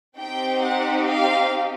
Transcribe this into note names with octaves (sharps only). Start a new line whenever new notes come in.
C4 D#4 G4 G5
F#5
F5